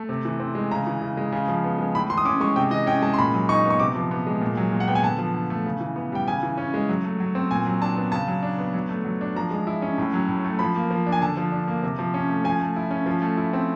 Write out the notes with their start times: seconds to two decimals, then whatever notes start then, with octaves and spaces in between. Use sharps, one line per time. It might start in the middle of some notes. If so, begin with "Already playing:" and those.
Already playing: A3
0.09 C3
0.25 E3
0.40 C4
0.55 G#3
0.71 C#3 A#5
0.87 E3
1.02 C#3
1.17 G#3
1.32 C#3
1.48 F3
1.64 B3
1.78 G#3
1.95 A2 B5
2.09 E3 C6
2.18 D#6
2.25 C#4 D6
2.41 G#3 C#6
2.56 C3 G5
2.71 E3 D#5
2.86 C#4 G5
3.02 G#3 A5
3.14 C6
3.18 A#2 B5
3.34 F#3
3.49 D#4 C#6
3.65 B3
3.70 C#6
3.80 C3 D6
3.96 F3
4.11 B3
4.27 G#3
4.41 A#2
4.57 F#3
4.72 A#2
4.80 F#5
4.88 B3 G5
4.95 G#5
5.03 D3 A5
5.18 F3
5.34 D3
5.50 A3
5.66 C#3
5.80 E3
5.96 B3
6.12 G3 G5
6.28 C#3 G#5
6.43 E3
6.58 C#4
6.74 G#3
6.89 F#3
7.04 A3
7.20 F#3
7.35 C4
7.51 A#2 G#5
7.66 F#3
7.82 D4 A5
7.96 B3
8.12 C#3 A5
8.28 F#3
8.43 D4
8.59 B3
8.74 F#3
8.89 A3
9.05 F#3
9.21 D4
9.36 F3 A#5
9.51 G#3
9.67 E4
9.82 C#4
9.98 A2
10.14 F#3
10.29 A2
10.44 A3
10.59 F3 B5
10.76 A#3
10.91 F3
11.06 D4
11.12 G#5
11.21 D3 A5
11.37 F3
11.52 D4
11.68 A#3
11.83 C3
11.99 F3
12.14 C#4
12.29 A3
12.44 F3 G#5
12.60 A3
12.76 E4
12.91 C#4
13.06 F3
13.22 A3
13.37 E4
13.53 C4